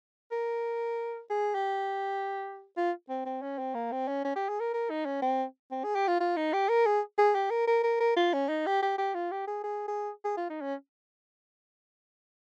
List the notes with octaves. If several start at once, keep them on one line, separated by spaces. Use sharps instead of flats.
A#4
G#4
G4
F4
C4
C4
C#4
C4
A#3
C4
C#4
C#4
G4
G#4
A#4
A#4
D#4
C#4
C4
C4
G#4
G4
F4
F4
D#4
G4
A#4
G#4
G#4
G4
A#4
A#4
A#4
A#4
F4
C#4
D#4
G4
G4
G4
F4
G4
G#4
G#4
G#4
G#4
F4
D#4
C#4